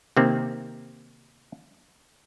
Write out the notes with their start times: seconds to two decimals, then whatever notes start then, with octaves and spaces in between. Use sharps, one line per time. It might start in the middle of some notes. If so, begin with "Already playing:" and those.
0.17 C3 D#3 A#3 C4